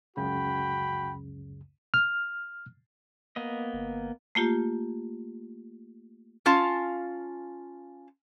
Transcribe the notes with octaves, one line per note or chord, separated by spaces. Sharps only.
C#2 F#2 C#3 F#4 G5 B5
F6
A#3 B3 D#5
G1
A3 A#3 F4 G4
C#4 F4 F5 A5